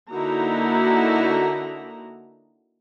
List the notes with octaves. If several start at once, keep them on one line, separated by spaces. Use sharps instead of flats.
D3 A#3 D#4 E4 F#4 A#5